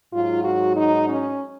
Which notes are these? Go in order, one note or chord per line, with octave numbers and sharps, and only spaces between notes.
G#2 F#3 F4
F#4
D#4
C#4